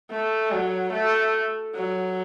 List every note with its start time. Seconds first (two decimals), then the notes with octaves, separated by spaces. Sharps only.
0.11 A3
0.52 F#3
0.93 A3
1.76 F#3